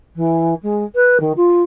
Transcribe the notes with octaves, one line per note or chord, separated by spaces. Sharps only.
E3
G#3
B4
D#3
F4